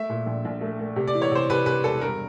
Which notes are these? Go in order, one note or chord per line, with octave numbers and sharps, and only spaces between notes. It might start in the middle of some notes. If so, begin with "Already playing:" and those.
Already playing: A3 E5
A#2
A#1
A#1
A3
A3
C3
D5
E3
C#5
C3 C5
C3 B4
C3 B4
E1 A4
G2 A#4